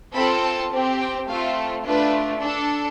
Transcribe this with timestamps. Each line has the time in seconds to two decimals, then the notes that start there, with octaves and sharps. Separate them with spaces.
0.14 C4 F4 A4 B5
0.42 A5
0.71 C4 G4
1.00 G5
1.28 A3 C4 F4 A4 F5
1.85 A3 D4 F4 B4
2.43 D4 A4